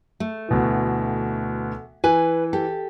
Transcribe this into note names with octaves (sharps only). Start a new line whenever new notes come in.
A3
D2 B2 E3
E3 B4 G#5
G4 A4